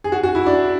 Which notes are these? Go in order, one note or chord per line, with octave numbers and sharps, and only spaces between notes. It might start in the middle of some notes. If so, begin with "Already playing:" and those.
G#4
F#4
F#4
E4
D4